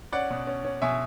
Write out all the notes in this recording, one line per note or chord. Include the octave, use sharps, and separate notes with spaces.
C#4 D5 F#5
B2
C#4
C#4
B2 E5 G#5